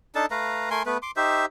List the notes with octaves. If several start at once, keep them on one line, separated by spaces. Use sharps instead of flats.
D4 D#4 A4 A5
A3 B4 F5 A#5
A3 A#4 G#5 C6
A3 B3 B4
C6 D6
D#4 G4 C5 E5